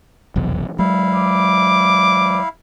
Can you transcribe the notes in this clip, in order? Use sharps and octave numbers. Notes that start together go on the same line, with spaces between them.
F1 B1 E2
F#3 G#3 E4 F5
D6